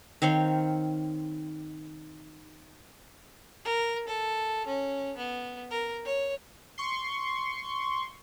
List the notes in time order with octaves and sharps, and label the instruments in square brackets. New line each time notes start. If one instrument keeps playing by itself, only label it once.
[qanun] D#3 C4 C#5 F5
[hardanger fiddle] A#4
A4
C#4
B3
A#4
C#5
[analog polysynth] C6 C#6